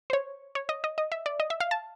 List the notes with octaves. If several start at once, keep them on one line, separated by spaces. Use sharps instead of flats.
C5
C#5
C#5
D#5
D#5
D#5
E5
D5
D#5
E5
F5
A5